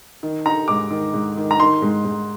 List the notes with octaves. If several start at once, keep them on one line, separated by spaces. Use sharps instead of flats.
D#3
D#4 A#5
G#2 D6
D#3
G#2
D#3
A#5
D#3 C6
G#2
G#2